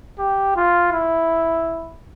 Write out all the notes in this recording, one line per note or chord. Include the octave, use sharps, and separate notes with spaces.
G4
F4
E4